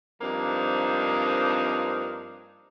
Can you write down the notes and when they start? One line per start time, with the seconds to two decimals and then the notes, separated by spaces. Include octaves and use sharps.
0.22 G2 F3 A#3 C4 D4 D#4